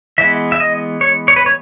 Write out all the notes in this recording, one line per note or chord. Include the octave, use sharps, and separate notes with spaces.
E3 G#3 B3 E5
E5
D#5
C#5
C#5
B4
C#5